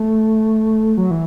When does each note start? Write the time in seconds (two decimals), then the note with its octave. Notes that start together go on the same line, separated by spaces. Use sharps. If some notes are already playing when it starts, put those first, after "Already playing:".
Already playing: A3
0.97 F#3
1.11 E3